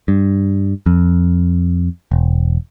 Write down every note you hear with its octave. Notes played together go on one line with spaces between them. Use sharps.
G2
F2
E1